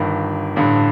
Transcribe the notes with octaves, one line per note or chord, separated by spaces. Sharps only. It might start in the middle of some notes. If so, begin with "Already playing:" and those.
Already playing: G1 G2 D#3
A1 G2 D3